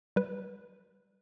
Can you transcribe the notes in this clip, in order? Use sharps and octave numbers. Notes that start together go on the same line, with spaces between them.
G3 B4